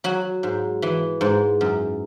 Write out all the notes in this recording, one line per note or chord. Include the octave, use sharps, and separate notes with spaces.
F#3 F#4
G#2
E3
G#2
F#2